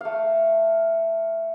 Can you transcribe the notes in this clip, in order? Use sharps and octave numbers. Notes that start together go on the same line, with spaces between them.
A3 F5